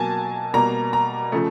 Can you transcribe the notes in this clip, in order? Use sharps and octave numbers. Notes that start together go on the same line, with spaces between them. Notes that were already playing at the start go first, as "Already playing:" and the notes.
Already playing: B2 F#3 A#3 G#5 A5
B2 G3 A#3 A#5
A#5
C#3 F3 A3